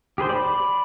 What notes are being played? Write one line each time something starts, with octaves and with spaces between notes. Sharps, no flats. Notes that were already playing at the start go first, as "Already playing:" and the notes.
G4 G#4 B4 C5
D5 B5